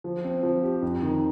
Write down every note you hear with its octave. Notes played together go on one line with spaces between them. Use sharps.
F3
C4
F3
G4
F2
D#3